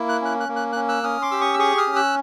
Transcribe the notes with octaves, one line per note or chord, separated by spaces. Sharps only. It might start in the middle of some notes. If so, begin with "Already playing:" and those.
Already playing: A#3 E4
F#6
C#4 F#6
F#6
A#3
F#6
F#6
C#4
E6 F#6
C#4 D#6 F6
C6 D6
G4 E6
C#6 D#6
E6
G#4 C#6 D#6
D#6 F6
C#4
E6 F#6